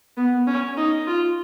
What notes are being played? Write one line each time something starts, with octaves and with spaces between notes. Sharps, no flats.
B3
C#4
D#4
F4